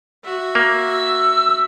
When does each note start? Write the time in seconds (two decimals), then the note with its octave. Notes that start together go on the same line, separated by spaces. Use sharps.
0.24 F#4 E5
0.55 A#3
0.91 E6